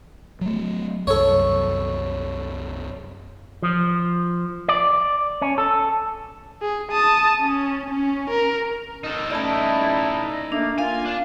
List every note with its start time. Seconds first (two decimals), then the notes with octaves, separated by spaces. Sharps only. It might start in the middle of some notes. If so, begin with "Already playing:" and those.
0.41 F#3 A3
1.07 C2 F#2 A4 C#5
3.63 F3
4.68 D5
5.42 C#4
5.58 A4
6.61 G#4
6.92 A5 D#6
7.41 C#4
7.90 C#4
8.30 A#4
9.04 D#4 A4
9.31 A3 C#4 E4 D5 A5
10.52 A3 A#3 D4
10.79 A#3 F4 F5 G#5
11.05 D4